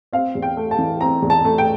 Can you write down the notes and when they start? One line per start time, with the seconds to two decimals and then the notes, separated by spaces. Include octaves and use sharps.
0.13 C4 F5
0.35 E2
0.42 G5
0.57 A3
0.71 A5
0.78 E3
1.01 C4 A#5
1.22 E2
1.30 A5
1.45 A3
1.58 G5